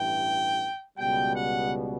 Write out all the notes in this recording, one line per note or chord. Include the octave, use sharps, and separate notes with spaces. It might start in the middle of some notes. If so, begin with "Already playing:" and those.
Already playing: A1 G2 E3 G5
C#2 B2 G3 B3 G5
F#5